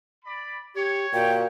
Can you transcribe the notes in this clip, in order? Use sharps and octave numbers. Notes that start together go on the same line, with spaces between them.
D5 B5
G4 C#5
A#2 F#4 G5